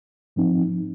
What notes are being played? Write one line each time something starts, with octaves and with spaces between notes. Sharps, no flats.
G#2 F3 C4 D#4